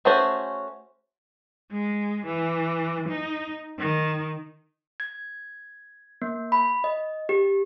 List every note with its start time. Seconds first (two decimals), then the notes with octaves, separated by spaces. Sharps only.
0.05 A3 C#4 F#4 G#4 C5
1.71 G#3
2.26 E3
3.08 D#4
3.78 D#3
5.00 G#6
6.22 A#3
6.52 B5
6.84 D#5
7.29 G4